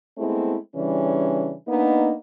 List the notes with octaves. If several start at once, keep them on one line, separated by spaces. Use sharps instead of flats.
G#3 A3 B3 C4 E4
C#3 E3 G3 C#4 D4
A#3 B3 D4 D#4